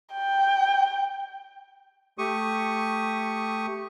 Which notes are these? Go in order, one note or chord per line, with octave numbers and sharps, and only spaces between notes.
G5
A3 G4 C#6 D#6